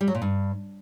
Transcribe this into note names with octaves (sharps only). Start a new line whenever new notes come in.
G3
F#3
A#2
G2